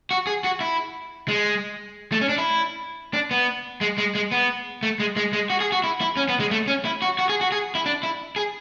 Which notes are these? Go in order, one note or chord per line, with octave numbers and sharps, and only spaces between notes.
F#4
G#4
F#4
E4
G#3
A3
C#4
D4
E4
D4
B3
G#3
G#3
G#3
B3
A3
G#3
G#3
G#3
F#4
G#4
F#4
E4
E4
C#4
B3
G#3
A3
C#4
E4
F#4
F#4
G#4
F#4
G#4
E4
D4
E4
G#4